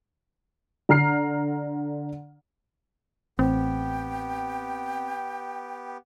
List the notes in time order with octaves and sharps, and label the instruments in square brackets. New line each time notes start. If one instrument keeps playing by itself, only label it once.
[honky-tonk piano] D3 A#5 F6 C7
[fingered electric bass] A1 [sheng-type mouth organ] B3 G4 [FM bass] C4 [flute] G5